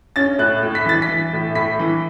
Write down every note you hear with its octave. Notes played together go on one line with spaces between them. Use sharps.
C#4 A6
A2 F#6
A2
B6
E3 A6
B6
E3
A2
A2 B6
E3